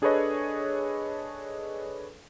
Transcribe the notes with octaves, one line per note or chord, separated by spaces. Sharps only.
D4 G#4 A4 B4 C#5 D#5